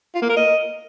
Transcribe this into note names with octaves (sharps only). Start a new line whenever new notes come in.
F4
A#3
A#4
D#5